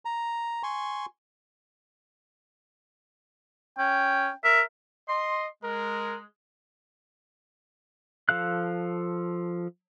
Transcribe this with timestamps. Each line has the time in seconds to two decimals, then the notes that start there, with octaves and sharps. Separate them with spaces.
0.05 A#5
0.63 G#5 C6 C#6
3.78 C#4 G5
4.44 A#4 E5
5.09 D#5 C6
5.64 G#3 A#4
8.29 F3 A4 F5 F#6